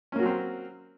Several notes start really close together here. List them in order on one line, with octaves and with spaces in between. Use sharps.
C#4 A#3 F#4 F#3 C4